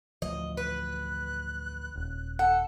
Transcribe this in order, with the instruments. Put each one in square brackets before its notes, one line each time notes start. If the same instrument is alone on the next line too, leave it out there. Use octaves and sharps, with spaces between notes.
[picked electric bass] A1 D2 F3 [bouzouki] D#5
[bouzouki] B4 [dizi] F#6
[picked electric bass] D#1
[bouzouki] A4 [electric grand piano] F#5